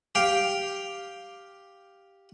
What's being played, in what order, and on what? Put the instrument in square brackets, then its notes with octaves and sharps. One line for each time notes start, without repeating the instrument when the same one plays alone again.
[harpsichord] G4 F5 G5